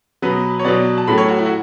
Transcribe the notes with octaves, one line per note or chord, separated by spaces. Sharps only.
B2 F#3 B3 B4
C#5
B2 F#3 B3 D5
A5
A2 F#3 A3 B5
C#5
F#4
E4
F#4